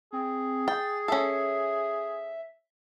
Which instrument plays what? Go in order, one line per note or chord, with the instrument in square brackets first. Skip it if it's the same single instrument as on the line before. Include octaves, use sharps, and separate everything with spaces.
[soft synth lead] C4 [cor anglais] G#4
[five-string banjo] G5 [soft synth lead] A6
[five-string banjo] C#4 A4 [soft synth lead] E5